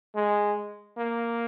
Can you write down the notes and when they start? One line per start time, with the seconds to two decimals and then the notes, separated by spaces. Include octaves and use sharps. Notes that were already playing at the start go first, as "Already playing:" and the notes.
0.15 G#3
0.97 A#3